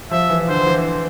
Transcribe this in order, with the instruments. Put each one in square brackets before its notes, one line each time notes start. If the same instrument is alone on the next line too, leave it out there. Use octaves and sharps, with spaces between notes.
[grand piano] F3 [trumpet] E5
[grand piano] E3
[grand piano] D3 [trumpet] C5
[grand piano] E3